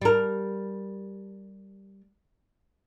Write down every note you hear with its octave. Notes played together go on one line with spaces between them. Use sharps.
G3 A#4